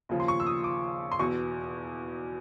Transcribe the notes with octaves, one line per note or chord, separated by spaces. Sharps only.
D#2 C#3 F3
C6
C#6
E6
D#6
D6
C6
E2 B2 C#6